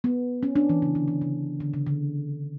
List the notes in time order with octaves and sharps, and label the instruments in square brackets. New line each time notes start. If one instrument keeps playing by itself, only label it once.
[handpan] B3
C#4
D4
E3
C#3
D3
E3
C#3
D3
C#3
D3